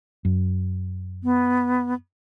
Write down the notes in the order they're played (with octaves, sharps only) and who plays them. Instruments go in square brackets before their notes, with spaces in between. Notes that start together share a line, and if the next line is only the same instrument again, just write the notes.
[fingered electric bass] F#2
[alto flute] B3